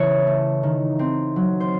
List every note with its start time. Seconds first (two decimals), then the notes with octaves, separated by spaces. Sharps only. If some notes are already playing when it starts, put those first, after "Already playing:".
Already playing: C#3 E3 A3 C#5
0.27 A3
0.63 D#3
0.99 C4
1.36 F#3
1.60 C5